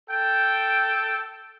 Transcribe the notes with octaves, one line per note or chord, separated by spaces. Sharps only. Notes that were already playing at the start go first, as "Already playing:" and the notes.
A4 G5